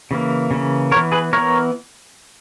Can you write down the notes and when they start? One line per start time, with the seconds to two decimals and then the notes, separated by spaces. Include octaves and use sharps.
0.11 C#3 E3 A#3
0.51 C#3 E3 A#3
0.91 B3 A#4 C#5
0.96 E3
1.12 G#4 B4
1.33 E3 B3 A#4 C#5